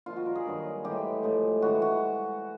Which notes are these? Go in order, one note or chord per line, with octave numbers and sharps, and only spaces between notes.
A#2 F3 G#3 F4
F#4
A#4
G#4
G2 D#3 F#3
A2 E3 G#3 G4
A2 F3 G#3
G2 E3 G#3 F#4
F#4